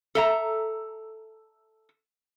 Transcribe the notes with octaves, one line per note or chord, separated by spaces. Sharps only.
A4 E5 A#5